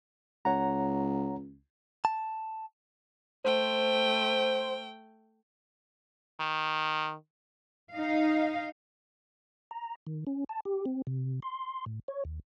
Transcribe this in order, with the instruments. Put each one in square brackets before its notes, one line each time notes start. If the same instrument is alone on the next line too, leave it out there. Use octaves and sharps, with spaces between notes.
[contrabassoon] C#2 [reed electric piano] C#5 F#5 A#5
[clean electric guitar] A5
[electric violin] A3 G5 [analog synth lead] C5
[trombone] D#3
[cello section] D#4 F5
[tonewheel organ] A#5
D#3
C#4
A5
G4
C4
C3
C6
A2
C#5
D#2